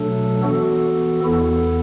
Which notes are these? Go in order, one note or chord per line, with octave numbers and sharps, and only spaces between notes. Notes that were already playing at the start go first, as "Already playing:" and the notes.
Already playing: B2 F#3 A3 D4 A4
E3 B3 F#4 A4
E2 E3 B3 E4 A4